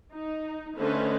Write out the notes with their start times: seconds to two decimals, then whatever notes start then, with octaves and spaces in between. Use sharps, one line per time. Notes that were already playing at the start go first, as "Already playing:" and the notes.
0.13 D#4
0.78 D3 A3 C#4 B4 C5 D#5